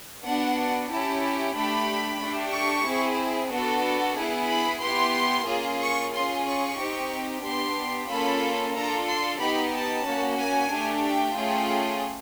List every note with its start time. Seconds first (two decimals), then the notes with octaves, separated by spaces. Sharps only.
0.23 B3 D4 F#4 F#5
0.89 C#4 E4 G4 A5
1.55 A3 D4 G4 B5
2.19 A3 D4 G4
2.53 C#6
2.85 C4 E4 G#4
3.51 B3 D4 F#4 A4
4.16 B3 E4 G#4
4.49 B5
4.81 B3 E4 G4 C6
5.47 A#3 C#4 F4 G#4
5.80 C#6
6.12 C#4 F4 G#4 C6
6.45 C#6
6.78 C4 D#4 G4
7.43 B3 D4 G4 C6
8.09 A#3 C#4 F4 A4 B5
8.74 D4 F4 A4 A#5
9.07 C6
9.39 B3 D#4 G4 B5
9.72 A5
10.05 A#3 C#4 F#4
10.38 G#5
10.71 A3 D4 G4
11.03 G5
11.36 A3 C#4 F4 G#4